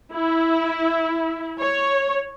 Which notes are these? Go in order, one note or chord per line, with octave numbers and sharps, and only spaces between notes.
E4
C#5